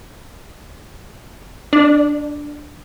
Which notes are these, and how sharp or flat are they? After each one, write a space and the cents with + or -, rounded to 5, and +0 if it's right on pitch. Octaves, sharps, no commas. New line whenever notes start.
D4 +0 D5 +35